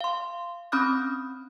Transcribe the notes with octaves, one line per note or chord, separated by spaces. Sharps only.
F5 C6
C4 C#4 B5 D#6 F6 F#6